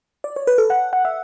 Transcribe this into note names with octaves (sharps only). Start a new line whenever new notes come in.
D5
C#5
B4
A4
F#5
F#5
E5